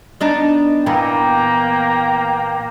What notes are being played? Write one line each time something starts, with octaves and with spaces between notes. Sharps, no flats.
B3 D4 D#4
A#2 E3 A#3 B3 G5 A#5